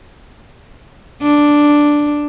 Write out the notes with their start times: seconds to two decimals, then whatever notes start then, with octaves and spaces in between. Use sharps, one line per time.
1.22 D4